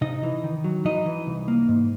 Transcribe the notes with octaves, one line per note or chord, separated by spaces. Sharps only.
C3 D#4 D#5
E3
D#3
F#3
E3 D#4 D#5
E3
C2
A#3
G#2